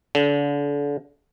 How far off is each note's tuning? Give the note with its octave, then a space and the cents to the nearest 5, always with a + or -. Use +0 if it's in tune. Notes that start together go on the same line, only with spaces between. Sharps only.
D3 -35